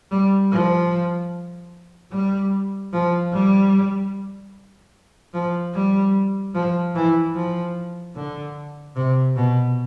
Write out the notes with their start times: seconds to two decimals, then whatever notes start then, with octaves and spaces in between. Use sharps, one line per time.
0.12 G3
0.51 F3
2.12 G3
2.93 F3
3.33 G3
5.34 F3
5.74 G3
6.55 F3
6.95 E3
7.35 F3
8.15 D3
8.96 C3
9.36 B2